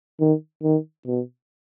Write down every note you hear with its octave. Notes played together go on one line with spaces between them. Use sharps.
D#3
D#3
B2